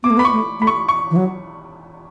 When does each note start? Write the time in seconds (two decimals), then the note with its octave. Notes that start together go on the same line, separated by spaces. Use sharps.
0.03 B3 D6
0.10 A3
0.17 B3 B5
0.25 C#6
0.32 A3
0.60 A3 B5
0.67 C#6
0.89 C#6
1.11 E3
1.16 F#3